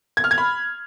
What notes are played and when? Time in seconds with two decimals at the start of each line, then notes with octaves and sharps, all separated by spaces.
0.17 G#6
0.24 F6
0.31 G#6
0.38 B5